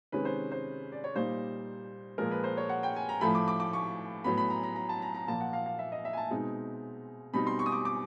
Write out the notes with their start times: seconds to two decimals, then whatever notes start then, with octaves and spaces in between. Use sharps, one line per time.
0.12 C3 D#3 G#3 C#4 B4
0.25 C5
0.52 C5
0.92 D5
1.04 C#5
1.15 A#2 G3 A#3 D#4 C5
2.18 A#2 F3 G#3 A#4
2.31 B4
2.44 C5
2.57 C#5
2.69 F#5
2.83 G5
2.96 G#5
3.09 A#5
3.21 A2 F3 A3 B5
3.35 D6
3.48 D6
3.60 D6
3.73 C#6
4.24 A2 F#3 B3 B5
4.38 B5
4.50 A#5
4.63 A#5
4.76 A#5
4.89 A5
5.02 A#5
5.15 A#5
5.27 A#2 F3 A#3 A5
5.41 F#5
5.53 F5
5.66 F5
5.79 E5
5.92 D#5
6.05 E5
6.13 G#5
6.17 A5
6.31 B2 G#3 C4 D#4
7.34 B2 G3 C4 D#4 B5
7.47 C6
7.59 C#6
7.66 D#6
7.72 D6
7.85 D6